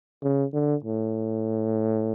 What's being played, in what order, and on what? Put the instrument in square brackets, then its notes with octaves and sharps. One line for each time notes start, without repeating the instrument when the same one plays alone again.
[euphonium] C#3
D3
A2